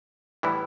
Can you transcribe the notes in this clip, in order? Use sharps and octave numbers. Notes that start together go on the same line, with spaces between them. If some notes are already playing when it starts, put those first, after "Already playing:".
A2 E3 G3 B3 E4